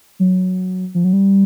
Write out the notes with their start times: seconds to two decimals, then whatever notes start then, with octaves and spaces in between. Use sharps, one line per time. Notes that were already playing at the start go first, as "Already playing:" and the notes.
0.19 F#3
0.94 F3
1.04 F#3
1.13 G3